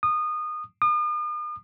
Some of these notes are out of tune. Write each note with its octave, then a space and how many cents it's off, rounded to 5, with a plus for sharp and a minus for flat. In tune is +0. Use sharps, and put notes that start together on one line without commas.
D#6 -25
D#6 -45